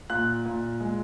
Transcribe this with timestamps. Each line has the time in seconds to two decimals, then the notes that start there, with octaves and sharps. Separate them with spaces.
0.10 A#2 F#6
0.45 A#2
0.80 G#3